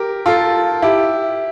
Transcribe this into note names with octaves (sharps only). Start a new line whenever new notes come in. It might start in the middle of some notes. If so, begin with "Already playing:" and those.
Already playing: G4 A#4
F4 A4
E4 G4